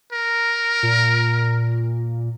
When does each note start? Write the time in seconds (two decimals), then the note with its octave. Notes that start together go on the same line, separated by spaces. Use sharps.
0.12 A#4
0.83 A#2